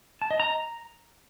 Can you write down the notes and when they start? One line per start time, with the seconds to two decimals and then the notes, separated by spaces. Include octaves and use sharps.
0.22 A5
0.31 D#5
0.40 A#5